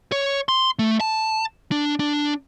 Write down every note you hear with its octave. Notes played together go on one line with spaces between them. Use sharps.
C#5
C6
A3
A5
D4
D4